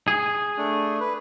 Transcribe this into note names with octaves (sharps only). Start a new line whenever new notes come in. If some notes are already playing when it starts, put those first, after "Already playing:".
G#4
A3 D4
B4